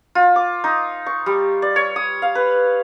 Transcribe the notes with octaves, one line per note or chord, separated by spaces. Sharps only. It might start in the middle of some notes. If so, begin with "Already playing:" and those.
F4
D6
D#4
C#6
G3
D5
C#5
D#6
F5
B4